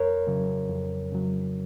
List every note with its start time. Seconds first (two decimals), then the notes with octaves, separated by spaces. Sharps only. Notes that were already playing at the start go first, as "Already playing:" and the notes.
Already playing: F2 A#4 C#5
0.27 C#3 F#3
0.69 F2
1.12 C#3 F#3